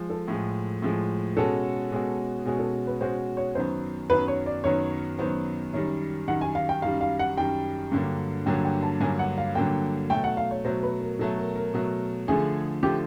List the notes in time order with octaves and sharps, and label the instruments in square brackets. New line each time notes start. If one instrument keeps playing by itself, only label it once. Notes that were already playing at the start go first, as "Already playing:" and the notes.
Already playing: [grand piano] F3 G#3
[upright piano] A4
[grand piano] A2 F3 G#3
A2 F3 G#3
[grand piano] B2 G#3 C#4 F#4 [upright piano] A4
[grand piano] B2 G#3 C#4 F#4
[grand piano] B2 G#3 C#4 F#4 [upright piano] G#4
[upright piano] A4
B4
[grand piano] B2 G#3 C#4 F#4 [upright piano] C5
[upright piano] C#5
[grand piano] F#2 D#3 F#3 B3 [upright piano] C5
[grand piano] F#2 D#3 F#3 B3 [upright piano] B4
[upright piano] C#5
D5
[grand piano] F#2 D#3 F#3 B3 [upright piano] C#5
[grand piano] F#2 D#3 F#3 B3 [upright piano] C5
[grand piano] F#2 D#3 G3 [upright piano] C#5
[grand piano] F#2 D#3 G3 [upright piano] F#5
[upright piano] G#5
F5
G5
[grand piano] F#2 D#3 G3 [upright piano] F5
[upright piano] F5
F#5
[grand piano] F#2 D#3 G3 [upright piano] G5
[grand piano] G2 D3 F#3 A#3
[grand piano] G2 D3 F#3 A#3 [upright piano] G5
[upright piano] G5
A5
[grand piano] G2 D3 F#3 A#3 [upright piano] G#5
[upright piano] F#5
F5
[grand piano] G2 D3 F#3 A#3 [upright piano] G5
[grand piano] B2 F#3 A3 [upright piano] G5
[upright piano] F#5
F5
C#5
[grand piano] B2 F#3 A3 [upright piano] C5
[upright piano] B4
A#4
[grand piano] B2 F#3 A3 [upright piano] A4
[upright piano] A#4
A#4
[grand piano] B2 F#3 A3
[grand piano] D3 F3 A3 [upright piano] G#4
[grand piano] D3 F3 A3 [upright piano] G4